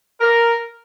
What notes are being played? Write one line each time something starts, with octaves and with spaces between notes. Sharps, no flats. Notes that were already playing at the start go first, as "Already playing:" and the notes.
A#4